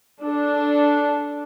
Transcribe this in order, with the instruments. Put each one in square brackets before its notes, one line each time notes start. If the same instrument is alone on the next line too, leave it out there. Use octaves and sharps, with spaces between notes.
[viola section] D4 A4